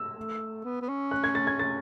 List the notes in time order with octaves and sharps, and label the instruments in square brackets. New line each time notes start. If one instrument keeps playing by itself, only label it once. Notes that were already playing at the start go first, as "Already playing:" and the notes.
Already playing: [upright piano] E6
[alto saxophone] A3
B3
B3
C#4
[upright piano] F#6
G#6
A6
G#6
A6